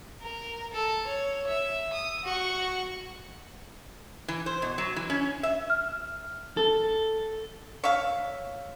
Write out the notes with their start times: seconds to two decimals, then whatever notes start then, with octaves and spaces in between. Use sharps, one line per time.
0.22 A#4
0.72 A4
1.06 C#5
1.47 E5
1.93 D#6
2.25 F#4 C#6
4.28 E3
4.46 C5
4.62 B2
4.78 F#3
4.96 E3
5.10 C#4
5.43 E5
5.70 F6
6.57 A4
7.84 C#5 E5 F5